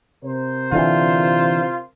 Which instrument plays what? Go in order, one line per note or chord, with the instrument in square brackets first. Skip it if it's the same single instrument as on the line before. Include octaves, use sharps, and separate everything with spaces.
[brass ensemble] C3 A#4 C5
[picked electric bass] D3 E3 [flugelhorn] F4